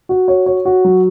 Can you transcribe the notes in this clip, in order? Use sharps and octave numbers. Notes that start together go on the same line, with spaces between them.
F#4
C#5
C#5
F#4
F#3